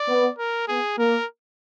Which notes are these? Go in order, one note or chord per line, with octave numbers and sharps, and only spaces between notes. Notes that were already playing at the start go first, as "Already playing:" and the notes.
Already playing: D5
B3
A#4
B3 G#4
A#3 A#4